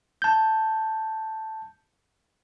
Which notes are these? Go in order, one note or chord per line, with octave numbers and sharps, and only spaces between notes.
A5 G6